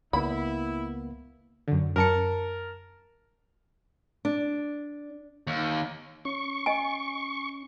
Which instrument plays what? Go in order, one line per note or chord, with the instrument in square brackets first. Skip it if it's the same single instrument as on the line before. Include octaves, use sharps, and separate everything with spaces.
[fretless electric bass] C#2 [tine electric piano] A#3 B3 [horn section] E4 [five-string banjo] B5
[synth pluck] F#2 D3
[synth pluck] F#2 C#7 [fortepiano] A#4 A5
[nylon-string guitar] D4
[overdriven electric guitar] D#2
[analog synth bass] C#4 [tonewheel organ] C#6
[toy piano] D#5 G#5